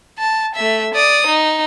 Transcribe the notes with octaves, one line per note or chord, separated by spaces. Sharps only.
A5
A3 E5
D5 D#6
D#4